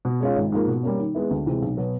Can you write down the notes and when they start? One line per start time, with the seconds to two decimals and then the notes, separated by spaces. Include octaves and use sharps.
0.05 B2
0.21 G#3 C#4 F4
0.36 G#1
0.52 G#2 F3 A#3
0.67 B2
0.83 G3 A#3 C#4
0.99 D#3
1.15 G#3 B3 E4
1.31 D2
1.46 C3 E3 G#3 C4
1.62 B1
1.77 B2 F#3 B3